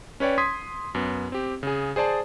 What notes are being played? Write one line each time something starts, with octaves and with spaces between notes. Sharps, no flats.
C#4 B4 C#5 D5 G5
C6 D#6 G#6 B6
F#2 B3
C4 G4
C#3 G#4
G#4 C5 D5 A5